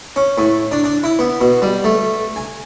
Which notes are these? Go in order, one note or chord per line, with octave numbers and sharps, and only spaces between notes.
C#4
A2
D4
D4
E4
B3
B2
G3
A3
G#5